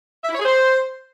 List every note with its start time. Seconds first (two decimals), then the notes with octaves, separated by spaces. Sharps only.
0.24 E5
0.29 E4
0.34 C#5
0.40 G#4
0.45 C5